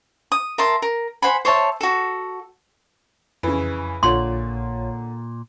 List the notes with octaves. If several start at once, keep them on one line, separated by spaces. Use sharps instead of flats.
D#6
A#4 E5 A5 C6
A#4
C5 F#5 G#5 B5
C5 C#5 E5 A5
F#4 A4
F2 C#3 E3
A#1 A#2 D3 F4 C#5 C6